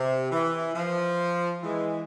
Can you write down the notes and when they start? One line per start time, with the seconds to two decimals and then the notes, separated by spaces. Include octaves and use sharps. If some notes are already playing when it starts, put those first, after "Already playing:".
Already playing: C3
0.32 E3
0.75 F3
1.63 E3 G#3